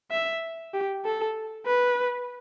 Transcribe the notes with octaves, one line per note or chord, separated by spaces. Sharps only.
E5
G4
A4
B4